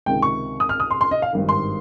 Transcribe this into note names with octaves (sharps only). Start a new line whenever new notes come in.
C#2 C3 D#3 G5
C#6
D#6
F6
D#6
C6
C6
D#5
F5
G#1 G2 D#3
C6